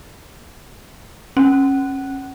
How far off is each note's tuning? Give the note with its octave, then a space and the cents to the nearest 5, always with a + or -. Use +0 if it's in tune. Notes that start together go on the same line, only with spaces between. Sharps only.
C#4 -25